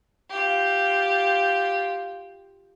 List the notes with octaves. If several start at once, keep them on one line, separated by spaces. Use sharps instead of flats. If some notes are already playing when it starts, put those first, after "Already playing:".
F4 G4